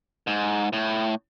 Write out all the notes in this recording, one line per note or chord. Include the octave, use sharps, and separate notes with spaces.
G#2
A2